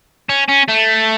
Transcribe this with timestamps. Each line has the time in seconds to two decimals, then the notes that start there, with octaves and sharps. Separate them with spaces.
0.29 C#4
0.48 C#4
0.68 A3